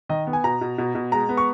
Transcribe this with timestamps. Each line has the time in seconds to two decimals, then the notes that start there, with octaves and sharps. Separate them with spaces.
0.09 D#3 D#5
0.27 B3
0.33 G#5
0.44 B2 A#5
0.61 B2
0.78 B2
0.95 B2
1.12 G#3 A#5
1.29 B3
1.37 C#6